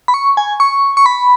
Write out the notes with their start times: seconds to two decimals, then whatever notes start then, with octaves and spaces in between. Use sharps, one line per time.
0.08 B5
0.14 C#6
0.37 G#5
0.60 C#6
0.97 C#6
1.06 B5